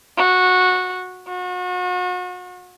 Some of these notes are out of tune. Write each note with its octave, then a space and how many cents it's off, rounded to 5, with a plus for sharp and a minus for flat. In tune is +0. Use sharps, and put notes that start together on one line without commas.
F#4 -15
F#4 -35